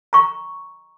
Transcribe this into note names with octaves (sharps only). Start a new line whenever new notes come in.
A#5 C#6